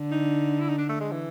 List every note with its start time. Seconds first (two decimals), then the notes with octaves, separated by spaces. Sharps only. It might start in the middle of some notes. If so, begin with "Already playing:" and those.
Already playing: D3
0.11 D#4
0.60 E4
0.69 D#4
0.78 D4
0.89 A3
1.00 G#3
1.11 E3